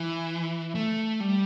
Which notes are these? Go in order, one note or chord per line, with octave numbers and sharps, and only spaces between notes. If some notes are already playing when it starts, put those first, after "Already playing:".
Already playing: E3
A3
G3